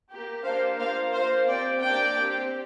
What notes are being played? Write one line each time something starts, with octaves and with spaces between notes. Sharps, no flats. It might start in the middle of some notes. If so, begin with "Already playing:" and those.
A#3 G4
A#3 D4 G4 C5 F5
A#3 F4 C5 F5
A#3 F4 C5 F5
C4 G4 D5 G5
A#3 D4 G4 D5 G5
C4 G4